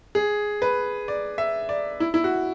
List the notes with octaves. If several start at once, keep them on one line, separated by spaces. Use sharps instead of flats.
G#4
B4
D5
E5
D5
E4
E4
F#4